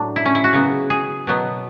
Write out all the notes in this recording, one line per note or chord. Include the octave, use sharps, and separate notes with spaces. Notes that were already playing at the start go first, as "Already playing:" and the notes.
Already playing: A2 F#3 A3 D4
E4
C#4
E4
F#4
C#3 F#3 B3
G#4
B2 F#3 B3